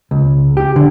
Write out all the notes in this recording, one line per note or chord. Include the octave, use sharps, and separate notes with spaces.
C#2
G4
D3